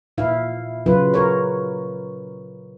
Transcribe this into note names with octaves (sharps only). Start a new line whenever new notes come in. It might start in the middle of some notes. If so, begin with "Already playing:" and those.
A#2 E4 F5
C#3 F#3 F4 B4
A#4 C#5